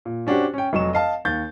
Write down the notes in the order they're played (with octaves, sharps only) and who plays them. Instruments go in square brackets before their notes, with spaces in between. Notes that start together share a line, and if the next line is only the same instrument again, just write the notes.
[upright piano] A#2
C#4 D4 F#4 G4 C5
C#4 G5
F1 F#3 D#5 C#6 E7
D#5 F5 A5
D#2 G6 A6